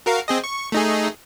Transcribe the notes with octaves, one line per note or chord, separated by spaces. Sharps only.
F#4 A#4 F5
C4 G#4 D#5
C#6
A3 D#4 G#4